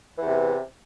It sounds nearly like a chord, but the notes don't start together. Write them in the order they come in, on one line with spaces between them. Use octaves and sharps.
E3 E2 C3